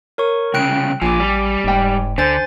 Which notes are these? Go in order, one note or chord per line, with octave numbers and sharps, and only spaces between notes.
A#4 C#5 C#6
C2 C#3 G5 F#6 D7
A1 A#2 F3 G#5 D6
G3
F1 G#2 G5
D2 D3 C5 G#5 G6 A6